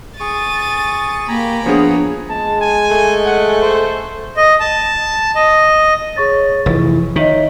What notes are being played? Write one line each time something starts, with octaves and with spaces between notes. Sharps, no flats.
G#4 C#6 A6 D#7
A#3 G4 G#5 A#5 B5
F3 B3 D4 G#4 C#5
G#3 A5
G#5
A3
F#5
C5
D#5
A5
D#5
G#4 C#5 C#6 A6
F1 E3
D#3 C#5 D#5 E5 B6